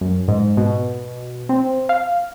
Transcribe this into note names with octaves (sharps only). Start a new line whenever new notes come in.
F#2
G#2
B2
C4
F5